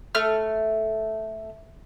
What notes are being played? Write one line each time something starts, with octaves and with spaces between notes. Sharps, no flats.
A3 F6